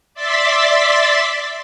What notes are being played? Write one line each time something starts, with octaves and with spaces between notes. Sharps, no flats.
D5 E5 C6 A6 B6